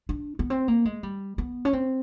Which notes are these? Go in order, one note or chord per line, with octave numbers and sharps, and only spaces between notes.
D4
B3
C4
A#3
G#3
G3
B3
C#4
C4